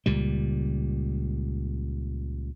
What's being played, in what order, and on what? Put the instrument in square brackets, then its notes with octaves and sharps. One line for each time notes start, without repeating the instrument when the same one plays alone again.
[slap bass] C#2 A#2 G3